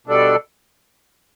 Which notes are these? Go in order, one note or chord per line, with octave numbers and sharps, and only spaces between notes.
B2 G3 D4 A4 D5